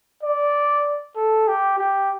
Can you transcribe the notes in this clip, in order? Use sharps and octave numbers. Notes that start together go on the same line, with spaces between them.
D5
A4
G4
G4